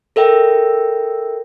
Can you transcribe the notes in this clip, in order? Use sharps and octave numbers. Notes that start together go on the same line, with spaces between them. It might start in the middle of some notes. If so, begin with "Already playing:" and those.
A4 A#4 E5 G5